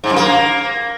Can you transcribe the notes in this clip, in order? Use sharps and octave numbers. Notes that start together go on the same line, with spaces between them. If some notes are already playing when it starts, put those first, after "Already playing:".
G#2
F#2
A#3